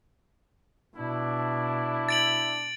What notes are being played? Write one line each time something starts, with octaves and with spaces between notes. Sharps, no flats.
B2 D4 E4
A6 D7 F#7